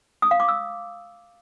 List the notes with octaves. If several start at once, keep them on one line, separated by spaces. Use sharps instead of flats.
D#6
F5
D6
E6